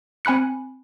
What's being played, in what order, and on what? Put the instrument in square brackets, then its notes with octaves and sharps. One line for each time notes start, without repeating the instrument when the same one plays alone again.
[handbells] C4 G#5 B5 F#6 C#7